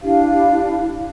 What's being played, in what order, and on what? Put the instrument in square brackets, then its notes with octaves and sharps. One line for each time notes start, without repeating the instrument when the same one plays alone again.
[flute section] D4 E4 G4 F5